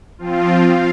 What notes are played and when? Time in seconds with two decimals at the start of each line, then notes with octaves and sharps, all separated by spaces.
0.18 F3 C4 F4
0.62 F5